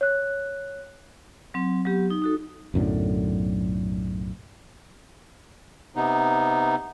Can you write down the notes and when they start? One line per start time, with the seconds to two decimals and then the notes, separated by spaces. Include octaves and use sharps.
0.01 C#5 F#6
1.54 F#3 C4
1.85 F#3 B3 G4
2.10 D#4
2.22 D#4 F#4 A4
2.74 B1 F#2 A2 D3
5.96 C3 B3 D#4